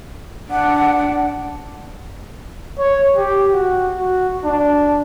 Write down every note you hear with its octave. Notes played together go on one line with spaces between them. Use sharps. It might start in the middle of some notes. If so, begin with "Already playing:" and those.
D4 F#5
C#5
G4
F#4
F#4
D4